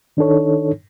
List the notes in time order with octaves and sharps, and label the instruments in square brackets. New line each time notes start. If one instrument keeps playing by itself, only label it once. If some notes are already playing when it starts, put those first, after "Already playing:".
[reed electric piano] D#3 D4 D#4 A4 C#5